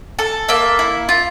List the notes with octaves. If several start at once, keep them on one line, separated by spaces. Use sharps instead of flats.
A4
A#3 E5
E4
F4